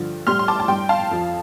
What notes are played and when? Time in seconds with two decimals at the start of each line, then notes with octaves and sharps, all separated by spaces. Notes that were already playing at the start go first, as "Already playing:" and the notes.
Already playing: G2 D3 F3
0.27 A2 G3 C6 F6
0.39 C6
0.48 A5 D6
0.60 A5
0.68 G2 G3 G5 C6
0.89 F5 A5
1.11 F2 F3